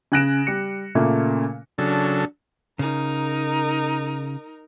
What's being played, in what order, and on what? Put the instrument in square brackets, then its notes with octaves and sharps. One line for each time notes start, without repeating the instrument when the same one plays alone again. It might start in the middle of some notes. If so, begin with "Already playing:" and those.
[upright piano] C#3 G#5 F#6 A#6 D7 E7
G3 C#7
A#2 C#3 A3 A#3
[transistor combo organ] C#3 F#3 A4 [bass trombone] D4
[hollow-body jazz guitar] C#3 [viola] D#4 A#4